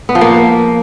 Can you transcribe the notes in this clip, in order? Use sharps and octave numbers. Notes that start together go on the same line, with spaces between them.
B3
F3
A#3